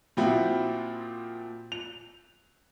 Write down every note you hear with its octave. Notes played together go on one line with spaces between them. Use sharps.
A#2 F3 C4 E4 F#4
F7